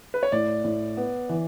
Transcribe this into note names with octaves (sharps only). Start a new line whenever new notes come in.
B4
C#5
A2 D5
A2
B3
E3